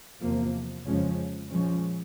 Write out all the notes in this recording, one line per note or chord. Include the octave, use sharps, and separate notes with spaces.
E2 C3 F3 A#3
F2 C#3 F3 G#3 C#4
A#2 F3 G#3 C#4